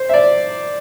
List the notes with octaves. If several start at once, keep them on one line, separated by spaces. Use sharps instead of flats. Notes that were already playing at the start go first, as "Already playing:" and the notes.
Already playing: C5
E5
D5